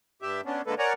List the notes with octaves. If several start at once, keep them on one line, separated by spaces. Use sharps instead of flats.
G2 G4 E5
B3 C#4 D4
D3 G#3 A#3 A4 B4
A#4 C#5 D5 F#5 G#5 A#5